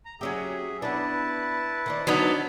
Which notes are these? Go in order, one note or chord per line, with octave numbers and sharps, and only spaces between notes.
A#5
F#3 C#4 G4 G#4 E5
B3 D4 E4 B4 A5
D#3 C4 D4
F#3 B3 D4 D#4 F#4